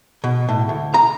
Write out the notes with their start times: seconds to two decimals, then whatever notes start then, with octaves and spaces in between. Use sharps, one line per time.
0.24 B2
0.49 A2
0.69 D2
0.94 A#5